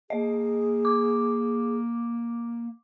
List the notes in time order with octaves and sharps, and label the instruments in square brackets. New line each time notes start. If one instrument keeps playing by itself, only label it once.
[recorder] A#3 [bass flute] G#4 [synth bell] D#5
[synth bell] D6